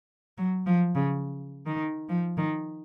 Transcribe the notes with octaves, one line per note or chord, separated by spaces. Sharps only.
F#3
F3
C#3
D#3
F3
D#3